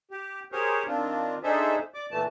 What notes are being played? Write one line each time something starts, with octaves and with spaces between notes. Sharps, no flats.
G4
G4 G#4 A#4 C5 C#5
D#3 C4 D4 F4
D4 D#4 G#4 A4 C5 E5
D5 D6
A#2 E3 A3 A5